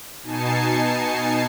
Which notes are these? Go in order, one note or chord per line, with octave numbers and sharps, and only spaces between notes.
B2 D#4 G#5 A5 C7 C#7